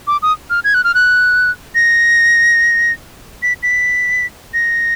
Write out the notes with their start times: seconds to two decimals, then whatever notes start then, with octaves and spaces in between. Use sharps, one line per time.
0.07 D6
0.22 D#6
0.50 F6
0.64 G#6
0.74 F#6
0.84 F6
0.95 F#6
1.75 A#6
3.43 B6
3.63 B6
4.54 A#6